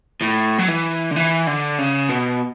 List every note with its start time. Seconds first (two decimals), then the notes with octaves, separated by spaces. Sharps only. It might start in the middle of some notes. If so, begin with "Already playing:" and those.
0.22 A2
0.59 F#3
0.69 E3
1.11 D3
1.16 E3
1.47 D3
1.78 C#3
2.09 B2